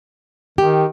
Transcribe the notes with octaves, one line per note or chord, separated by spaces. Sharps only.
D#3 G4